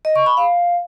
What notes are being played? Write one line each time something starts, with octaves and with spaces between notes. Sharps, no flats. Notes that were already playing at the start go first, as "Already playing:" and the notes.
D#5
C#6
B5
F5